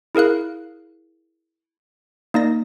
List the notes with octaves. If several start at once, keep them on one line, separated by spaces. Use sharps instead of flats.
E4 G#4 A#4 F5 F#6
A#3 D#4 D5 A#6